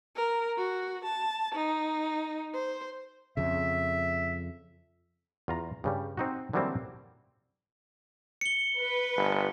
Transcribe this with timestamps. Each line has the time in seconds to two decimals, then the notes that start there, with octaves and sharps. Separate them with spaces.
0.15 A#4
0.58 F#4
1.04 A5
1.55 D#4
2.54 C5
3.37 F2 C#3 E5
5.48 E2 F4 A#5
5.84 G2 C#3 G3
6.17 C4 D#4 F#4
6.53 D3 E3 F#3 G3 A#3 C4
8.41 C#7 G7
8.78 B4
9.16 G1